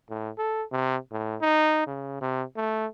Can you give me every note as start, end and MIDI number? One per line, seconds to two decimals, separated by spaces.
0.10 0.30 45
0.39 0.63 69
0.72 0.96 48
1.12 1.36 45
1.41 1.84 63
1.87 2.19 49
2.21 2.43 48
2.57 2.86 57